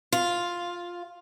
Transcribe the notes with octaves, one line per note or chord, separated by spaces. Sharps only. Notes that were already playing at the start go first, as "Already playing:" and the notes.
F4